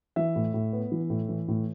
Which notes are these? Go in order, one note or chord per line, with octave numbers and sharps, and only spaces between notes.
E3 E5
A2
A2
B3
E3
A2
E3
A2